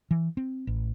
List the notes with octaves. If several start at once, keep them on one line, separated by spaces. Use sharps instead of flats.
E3
C4
A1